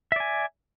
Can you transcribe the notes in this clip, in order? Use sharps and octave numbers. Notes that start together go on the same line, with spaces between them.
D5 E5 G#5